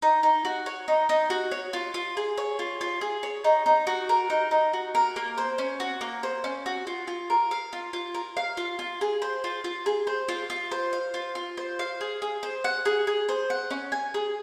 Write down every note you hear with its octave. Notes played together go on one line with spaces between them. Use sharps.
D#4
D#4
F#4
C#5
D#4
D#4
F#4
C#5
F4
F4
G#4
C#5
F4
F4
G#4
C#5
D#4
D#4
F#4
A#4
D#4
D#4
F#4
A#4
A#3
C5
C#4
F#4
A#3
C5
C#4
F#4
F4
F4
A#4
F5
F4
F4
A#4
F5
F4
F4
G#4
C5
F4
F4
G#4
C5
F4
F4
C5
F5
F4
F4
C5
F5
G#4
G#4
C5
F#5
G#4
G#4
C5
F#5
C#4
G#5
G#4